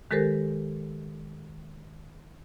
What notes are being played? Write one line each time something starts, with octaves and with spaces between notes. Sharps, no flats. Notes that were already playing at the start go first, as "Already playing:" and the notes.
D#3 G#3 G4 A4 A#4 C5